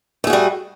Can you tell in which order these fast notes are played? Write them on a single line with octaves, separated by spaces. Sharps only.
A3 G#4 F#4 G3